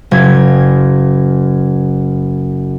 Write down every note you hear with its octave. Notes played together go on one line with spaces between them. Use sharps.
F#1 G#6